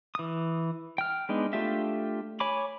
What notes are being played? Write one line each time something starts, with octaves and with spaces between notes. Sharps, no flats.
E3 D#6
G5 F6
G#3 B3 D4 D#4
A3 D4 F4 G4 E5
C#5 G#5 B5 D6